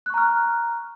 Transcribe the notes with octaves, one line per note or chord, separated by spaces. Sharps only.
A#5 C#6 F6 F#6